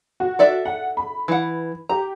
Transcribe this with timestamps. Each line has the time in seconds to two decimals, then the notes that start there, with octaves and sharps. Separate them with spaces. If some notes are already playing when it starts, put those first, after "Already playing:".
0.20 F#4
0.39 A4 D5 E5
0.65 F#5
0.97 B5
1.28 E3 F#5
1.89 G4 A#5